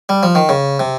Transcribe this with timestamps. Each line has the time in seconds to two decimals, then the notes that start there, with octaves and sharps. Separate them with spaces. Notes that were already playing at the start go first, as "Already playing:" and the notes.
0.09 G3
0.23 F3
0.35 D#3
0.49 C#3
0.80 C3